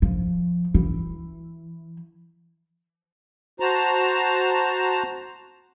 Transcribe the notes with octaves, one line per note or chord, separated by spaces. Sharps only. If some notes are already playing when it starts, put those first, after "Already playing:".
F3
E3
F#4 C5 A5 A#5